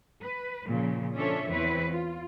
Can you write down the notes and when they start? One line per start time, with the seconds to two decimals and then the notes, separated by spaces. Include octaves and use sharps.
0.21 B4
0.67 A#2 C#3 F3
1.16 F3 C#4 D4 A4 C#5 E5
1.50 E2 C4 E4 B4 C#5
1.91 F4